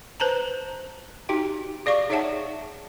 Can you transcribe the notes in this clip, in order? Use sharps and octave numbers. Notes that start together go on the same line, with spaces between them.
B4 C5 A5 A#5
D#4 F#4 G4 G5
G#4 D5 F5 C#6 D6
D#4 G#4 C#5 E5 F#5 A5